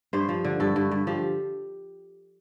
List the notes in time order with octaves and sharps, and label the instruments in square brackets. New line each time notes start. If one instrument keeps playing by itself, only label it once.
[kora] G2 C5
F3
D3
G2 A4
G2
G2
F3 G4